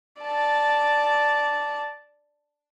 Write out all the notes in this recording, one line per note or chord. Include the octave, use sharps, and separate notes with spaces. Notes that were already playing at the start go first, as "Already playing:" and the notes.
D5 A5